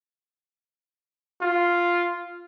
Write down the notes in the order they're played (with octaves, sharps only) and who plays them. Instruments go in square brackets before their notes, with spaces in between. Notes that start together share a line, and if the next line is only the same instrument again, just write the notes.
[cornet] F4